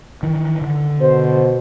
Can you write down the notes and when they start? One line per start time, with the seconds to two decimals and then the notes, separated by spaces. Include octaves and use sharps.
0.23 D#3 E3
0.62 D3
1.00 B2 C5